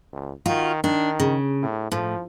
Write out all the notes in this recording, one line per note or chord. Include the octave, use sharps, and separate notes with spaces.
C#2
D#3 F4 F#4
D#3 D4
C#3
A2
A2 F3